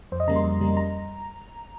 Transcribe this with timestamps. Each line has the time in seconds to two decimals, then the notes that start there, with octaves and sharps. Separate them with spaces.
0.12 F2 C5
0.20 D#5
0.28 C#3 G3 A#3 A#5
0.36 C6
0.44 F2
0.60 C#3 G3 A#3
0.77 A#5